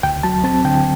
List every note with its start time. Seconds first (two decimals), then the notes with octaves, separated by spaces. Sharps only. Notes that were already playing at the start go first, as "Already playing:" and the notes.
0.03 D2 G5
0.23 F#3 A5
0.44 C4 A5
0.65 D3 G5